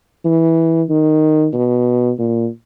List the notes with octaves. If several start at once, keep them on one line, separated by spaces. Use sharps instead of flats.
E3
D#3
B2
A#2